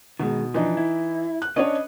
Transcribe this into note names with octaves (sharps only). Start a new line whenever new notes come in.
B2 D#3 G#3
E3 F3 D4 D#4 D#5
E4
F#6
C#4 D4 B4 C#5 D#5